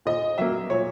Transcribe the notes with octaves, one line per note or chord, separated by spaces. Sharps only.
A#2 D#5
F#3 A#3 E5
A#2 C#5